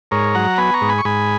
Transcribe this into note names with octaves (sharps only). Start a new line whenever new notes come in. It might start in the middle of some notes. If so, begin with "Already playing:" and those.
G#2 A#4 C#5
F#3 F#5 A#5
B3 G#5 B5
A#5 C#6
G#2
G#5 B5
C#6
G#2 G#5 B5